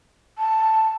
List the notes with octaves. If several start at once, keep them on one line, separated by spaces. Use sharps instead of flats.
A5